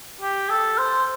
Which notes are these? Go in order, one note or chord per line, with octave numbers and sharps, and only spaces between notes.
G4
A4
C5